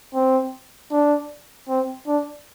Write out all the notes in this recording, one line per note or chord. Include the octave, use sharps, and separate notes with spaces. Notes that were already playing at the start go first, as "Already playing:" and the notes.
C4
D4
C4
D4